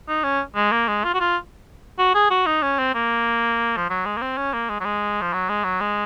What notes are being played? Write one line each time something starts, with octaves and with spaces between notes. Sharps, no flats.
D#4
C#4
G#3
A#3
G#3
F4
F#4
F4
F#4
G#4
F#4
D#4
C#4
C4
A#3
F3
F#3
G#3
A#3
C4
C#4
A#3
G#3
F#3
G#3
F3
F#3
G#3
F#3
G#3